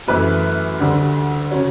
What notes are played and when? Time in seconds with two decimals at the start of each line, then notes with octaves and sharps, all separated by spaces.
0.08 F#2 E3 A3 B4
0.80 D2 D3 G3
1.51 C#3 F#3 C#5